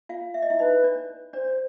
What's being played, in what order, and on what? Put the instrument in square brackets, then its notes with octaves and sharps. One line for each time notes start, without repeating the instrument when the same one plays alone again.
[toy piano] F4 F5
E5
D#5
E4 E5
[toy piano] D#4 D#5 [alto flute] B4
[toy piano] D4 D5
[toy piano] D4 D5 [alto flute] C5